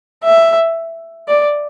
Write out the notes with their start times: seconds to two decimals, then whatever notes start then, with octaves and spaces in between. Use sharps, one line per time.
0.23 E5
1.28 D5